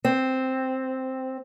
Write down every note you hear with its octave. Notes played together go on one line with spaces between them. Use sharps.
C4